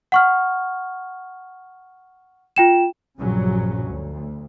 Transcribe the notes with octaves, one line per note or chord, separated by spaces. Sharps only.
F#5 C#6 F6
F4 G5 E7
A#1 G2 C#3 F3 F#3 C#4
D2